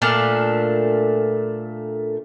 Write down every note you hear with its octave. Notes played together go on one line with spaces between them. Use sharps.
A#2 A3 D4 F5